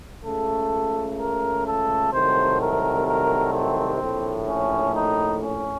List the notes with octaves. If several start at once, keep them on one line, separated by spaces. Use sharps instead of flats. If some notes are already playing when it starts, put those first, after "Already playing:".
C#2 C#3 A3 A4
A#4
A4
C2 C3 D#3 F#3 A3 C5
A#4
A#4
C4
A#1 A2 A3
C#4
D#4
C#4